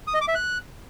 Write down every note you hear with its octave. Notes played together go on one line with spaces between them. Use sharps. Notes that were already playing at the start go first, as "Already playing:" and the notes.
D#6
D#5
D6
E5
F#6